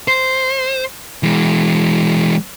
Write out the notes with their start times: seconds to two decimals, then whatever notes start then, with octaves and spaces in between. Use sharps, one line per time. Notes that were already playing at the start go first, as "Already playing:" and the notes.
0.08 C5
1.23 E3 G#3